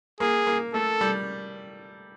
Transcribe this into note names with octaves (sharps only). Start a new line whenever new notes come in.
A#3 G#4
A#3
A3 A4
G3